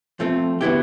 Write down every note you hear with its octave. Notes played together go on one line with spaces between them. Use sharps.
F3 A3 C4
D3 F#3 B3 E4 G4